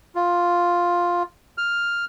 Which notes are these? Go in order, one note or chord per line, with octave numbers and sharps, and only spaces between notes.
F4
F6